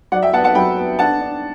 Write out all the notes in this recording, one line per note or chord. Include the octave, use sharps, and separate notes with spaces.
F#3 D5 F#5
E5 G5
B3 F#5 A5
F#5 A5
F#3 G5 B5
B3
D4 F#5 A5
D4